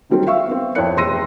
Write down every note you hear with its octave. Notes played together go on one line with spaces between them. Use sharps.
D3 D#3 F#3 G3 C4 D4
E5 F5 C#6 E6
B3 C4
F2 C4 E4 C#5 F#6 C#7
F1 E2 C6 E6 A#6 D#7